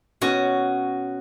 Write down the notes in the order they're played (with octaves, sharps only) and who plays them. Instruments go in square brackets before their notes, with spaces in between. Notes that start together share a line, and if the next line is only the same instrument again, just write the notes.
[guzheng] B2 C#4 F#4